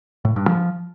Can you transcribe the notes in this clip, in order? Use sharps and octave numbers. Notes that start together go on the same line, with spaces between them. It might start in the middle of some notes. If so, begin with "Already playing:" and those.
A2
G2
F3